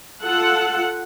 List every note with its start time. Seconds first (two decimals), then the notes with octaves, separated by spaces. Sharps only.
0.22 F4 A4 F#5